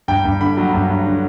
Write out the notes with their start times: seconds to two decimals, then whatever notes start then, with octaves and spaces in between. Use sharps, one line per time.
0.08 G2 G5
0.25 G2
0.41 D3 B5
0.57 F#3
0.74 G2
0.90 G2
1.06 D3